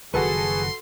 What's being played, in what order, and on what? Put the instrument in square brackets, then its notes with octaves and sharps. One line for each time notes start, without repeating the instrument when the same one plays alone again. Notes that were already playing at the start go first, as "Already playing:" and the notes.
[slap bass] F#1 D#3 F3 [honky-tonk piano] F#4 A4 B4 [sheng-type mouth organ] G#4 [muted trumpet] C6